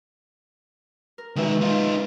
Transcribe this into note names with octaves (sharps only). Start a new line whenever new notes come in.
A#4
B2 D#3 G#3 E5
D#4 F4